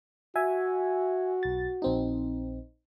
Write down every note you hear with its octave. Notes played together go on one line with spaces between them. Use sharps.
F#4 E5 G#5
B1 A6
A#1 C4 D#4